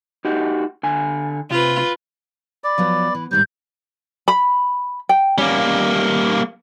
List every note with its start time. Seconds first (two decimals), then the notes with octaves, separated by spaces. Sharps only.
0.25 D#4 F#4 G4
0.83 D3 G#5
1.51 C3 F4 B4
2.64 D5 B5
2.78 F3 F#3 B3
3.14 E3
3.31 G#2 D#3 G3 G6
4.28 B5
5.09 G5
5.38 G3 A#3 C#4